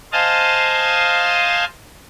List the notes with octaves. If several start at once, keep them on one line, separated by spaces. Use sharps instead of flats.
C5 D#5 F5 G#5 A5